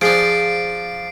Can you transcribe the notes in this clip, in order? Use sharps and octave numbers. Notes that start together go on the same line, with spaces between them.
F3 D4 G#4 C5 C7 D7